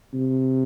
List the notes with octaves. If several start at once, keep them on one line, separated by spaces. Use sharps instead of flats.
C3